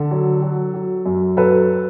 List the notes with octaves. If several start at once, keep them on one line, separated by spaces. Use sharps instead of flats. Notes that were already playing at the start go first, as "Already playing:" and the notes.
Already playing: D3 A4
F#3
F#3
F#3
F#2
F#3 A4 B4